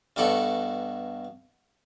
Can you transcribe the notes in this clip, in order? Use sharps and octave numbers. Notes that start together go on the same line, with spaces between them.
G2 B2 A4 D5 C#6